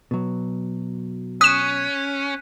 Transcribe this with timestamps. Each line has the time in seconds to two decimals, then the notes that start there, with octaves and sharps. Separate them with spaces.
0.11 B2 F#3
1.41 C#4 D#6 F#6 B6 D#7 E7